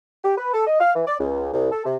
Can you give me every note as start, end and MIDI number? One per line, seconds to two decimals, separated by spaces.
0.24 0.37 67
0.38 0.51 71
0.53 0.65 69
0.67 0.78 75
0.80 0.94 77
0.95 1.03 52
1.07 1.15 74
1.20 1.52 37
1.53 1.71 36
1.72 1.84 69
1.85 1.96 48